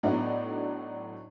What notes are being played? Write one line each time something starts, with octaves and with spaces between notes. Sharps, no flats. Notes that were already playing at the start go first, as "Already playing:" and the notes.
A2 F#3 A3 B3 D4 D#4